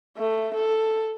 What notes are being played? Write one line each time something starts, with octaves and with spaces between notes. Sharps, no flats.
A3
A4